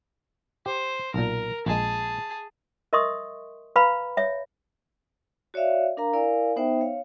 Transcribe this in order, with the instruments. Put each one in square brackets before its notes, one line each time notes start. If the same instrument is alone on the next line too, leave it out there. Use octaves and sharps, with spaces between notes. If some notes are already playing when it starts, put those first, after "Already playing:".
[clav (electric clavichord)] G4 [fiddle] C5
[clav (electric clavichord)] B1 A#2 [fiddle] A#4
[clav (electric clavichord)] A#1 G#3 [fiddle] G#4 A5
[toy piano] A#4 D#5 E5 C6 C#6 D#6
B4 F5 A#5 B5
C#5 E5
[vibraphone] F#4 C#5 D5 E5 F5
D4 A#4 F5 A#5
E4 A#4 D5 F5 G#5
B3 D#4 C5 E5 G5
C#5 F5